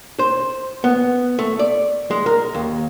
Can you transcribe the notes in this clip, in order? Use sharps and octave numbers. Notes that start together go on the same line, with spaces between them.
C5
B3
A3
D5
G#3
A#4
D#2